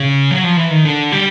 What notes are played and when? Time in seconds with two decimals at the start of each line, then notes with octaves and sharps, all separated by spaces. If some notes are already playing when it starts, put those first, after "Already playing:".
Already playing: C#3
0.31 F#3
0.44 F3
0.57 E3
0.71 D#3
0.84 D3
1.12 G3